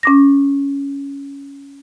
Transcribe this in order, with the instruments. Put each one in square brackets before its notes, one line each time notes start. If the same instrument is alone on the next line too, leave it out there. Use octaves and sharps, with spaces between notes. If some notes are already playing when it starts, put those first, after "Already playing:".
[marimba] C#4 D6 A#6